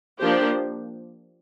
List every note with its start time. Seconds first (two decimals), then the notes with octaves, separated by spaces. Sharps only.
0.20 F3 A#3 D4 G4 C5